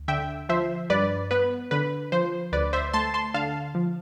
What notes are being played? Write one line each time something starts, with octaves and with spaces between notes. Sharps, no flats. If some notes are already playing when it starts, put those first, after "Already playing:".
Already playing: D2
D3 E5 G5
F3 C5 E5
G2 B4 D5
B3 B4
D3 B4
F3 C5
D2 B4 D5
C5 E5
A3 A5 C6
A5 C6
D3 F5 A5
F3